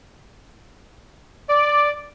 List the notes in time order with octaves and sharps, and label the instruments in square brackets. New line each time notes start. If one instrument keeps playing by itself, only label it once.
[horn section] D5